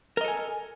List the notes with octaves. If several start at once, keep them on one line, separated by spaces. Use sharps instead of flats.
A4 A#4 D#5 G#5